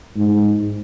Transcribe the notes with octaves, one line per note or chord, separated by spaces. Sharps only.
G#2